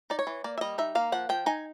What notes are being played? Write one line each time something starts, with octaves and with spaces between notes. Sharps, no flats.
D#4 D5
C#5
E3
A#3 D5
E5
G3 D#5
D#4 E5
A#3 F5
F3 F#5
F3 G5
D#4 G#5